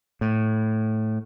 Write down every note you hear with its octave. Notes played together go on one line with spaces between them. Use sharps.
A2